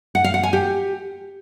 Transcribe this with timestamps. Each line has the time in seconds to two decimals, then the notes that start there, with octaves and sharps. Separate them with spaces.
0.15 F#5
0.24 F5
0.34 F#5
0.43 G#5
0.53 G4